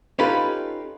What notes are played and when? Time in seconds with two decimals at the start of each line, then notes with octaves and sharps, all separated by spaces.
0.19 C#4 D#4 F4 G4 A4 B4